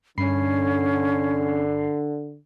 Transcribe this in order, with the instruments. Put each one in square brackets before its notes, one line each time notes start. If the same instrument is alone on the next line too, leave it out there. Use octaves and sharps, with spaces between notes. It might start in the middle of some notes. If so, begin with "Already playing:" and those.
[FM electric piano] G2 B5 C7 [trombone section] D3 [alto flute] C#4